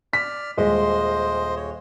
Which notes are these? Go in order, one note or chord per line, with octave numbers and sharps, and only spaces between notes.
D5 F6 B6
D#1 G#3 C5 D#5 C6
C#5